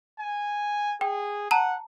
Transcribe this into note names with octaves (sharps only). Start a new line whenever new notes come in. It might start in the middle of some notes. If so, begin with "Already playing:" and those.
G#5
G#4 G5
F#5 A5 A#5